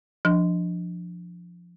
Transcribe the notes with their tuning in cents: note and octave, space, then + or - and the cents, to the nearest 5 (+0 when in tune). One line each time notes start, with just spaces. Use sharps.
F3 +0 D4 +5